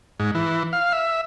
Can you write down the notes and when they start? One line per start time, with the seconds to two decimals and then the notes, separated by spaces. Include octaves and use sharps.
0.19 G#2
0.35 E3
0.73 F5
0.93 E5